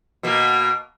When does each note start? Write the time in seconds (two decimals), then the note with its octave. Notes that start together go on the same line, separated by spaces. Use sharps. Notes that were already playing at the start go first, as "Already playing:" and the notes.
0.23 B2 A#3